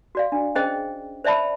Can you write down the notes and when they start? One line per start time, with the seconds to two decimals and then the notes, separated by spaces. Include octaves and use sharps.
0.15 F#4 D5 F5
0.32 D4
0.55 C#4 G#4 C5 D#5 G5
1.24 C5 D5 E5 A5 B5